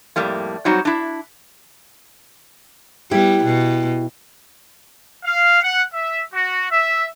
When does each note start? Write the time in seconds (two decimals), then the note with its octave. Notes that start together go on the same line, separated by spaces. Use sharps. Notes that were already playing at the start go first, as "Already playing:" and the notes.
0.16 F2 A2 G3 A#3
0.65 F#3 G3 C4 D#4 F#4
0.85 D4 E4
3.11 G3 B3 E4 G4
3.44 B2
5.24 F5
5.62 F#5
5.93 E5
6.33 F#4
6.71 E5